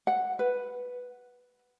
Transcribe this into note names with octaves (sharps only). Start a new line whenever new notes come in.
F#5
B4